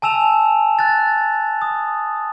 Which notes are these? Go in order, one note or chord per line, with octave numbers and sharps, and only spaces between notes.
G#5 A5 E6 E7 F7
F#6 A6
D#6